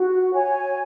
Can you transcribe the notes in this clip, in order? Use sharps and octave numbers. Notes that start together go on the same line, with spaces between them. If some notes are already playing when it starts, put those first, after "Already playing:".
Already playing: F#4
C#5 G#5